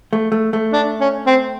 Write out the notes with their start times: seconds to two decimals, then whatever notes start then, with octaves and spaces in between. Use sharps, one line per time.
0.13 A3
0.32 A3
0.53 A3
0.73 D4
1.00 C#4
1.26 C4